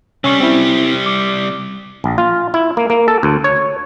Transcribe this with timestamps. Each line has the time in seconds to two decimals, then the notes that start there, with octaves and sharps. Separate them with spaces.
0.24 C3 G3 C#4 C#6
0.40 C4 E4
1.06 D6
2.04 A#1
2.18 F4
2.54 E4
2.77 A#3
2.90 A#3
3.08 A4
3.23 D2
3.44 C#5